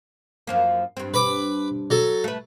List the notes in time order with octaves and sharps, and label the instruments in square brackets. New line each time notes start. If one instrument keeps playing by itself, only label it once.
[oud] F#2 F3 A#3
G2 C4
[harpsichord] B4 B5 D6
F#3 A4
[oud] A3 B4